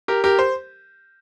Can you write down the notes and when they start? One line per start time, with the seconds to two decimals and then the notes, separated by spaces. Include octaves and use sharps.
0.08 G4 A#4
0.24 G4 A#4
0.39 C5